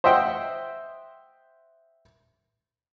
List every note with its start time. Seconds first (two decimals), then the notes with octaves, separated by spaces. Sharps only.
0.04 C5 D#5 E5 F#5 G5